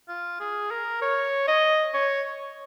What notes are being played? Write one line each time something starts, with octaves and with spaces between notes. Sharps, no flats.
F4
G#4
A#4
C#5
D#5
C#5